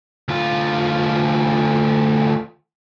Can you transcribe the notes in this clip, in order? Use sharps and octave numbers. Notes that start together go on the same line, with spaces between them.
D2 F4